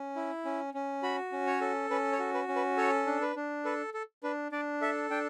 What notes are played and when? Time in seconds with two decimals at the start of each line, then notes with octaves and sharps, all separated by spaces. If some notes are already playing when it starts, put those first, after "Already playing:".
Already playing: C#4
0.16 E4
0.45 C#4
0.74 C#4
1.03 F#4 B5
1.32 C#4
1.47 C#5
1.61 A4
1.90 C#4 B4
2.12 C#5
2.19 F#4
2.34 B4
2.48 C#4
2.56 B4
2.77 A4 C#5
3.07 D4
3.21 B4
3.36 D4
3.65 A4 B4
3.94 A4
4.23 D4 B4
4.52 D4 D5
4.81 A4 E5
5.10 D4 G5